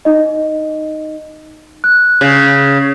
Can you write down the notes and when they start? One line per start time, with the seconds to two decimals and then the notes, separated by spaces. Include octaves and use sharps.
0.05 D#4 D#5
1.84 F#6
2.21 C#3